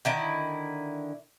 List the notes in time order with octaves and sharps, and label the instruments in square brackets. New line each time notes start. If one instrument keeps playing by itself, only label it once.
[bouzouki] D3 D#3 E4